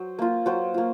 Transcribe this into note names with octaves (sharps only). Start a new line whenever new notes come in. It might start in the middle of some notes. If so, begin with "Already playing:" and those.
Already playing: F#3 C5
A#3 F4
F#3 C5
A#3 F4